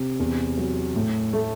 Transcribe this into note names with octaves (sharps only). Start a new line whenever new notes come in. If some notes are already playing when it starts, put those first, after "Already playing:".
Already playing: C3
E2
F#3
A2
A3